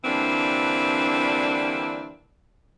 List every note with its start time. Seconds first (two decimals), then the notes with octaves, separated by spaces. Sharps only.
0.04 D3 E3 G3 A#3 C4 D4